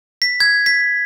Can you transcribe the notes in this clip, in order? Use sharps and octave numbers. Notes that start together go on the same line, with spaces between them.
B6
G#6
B6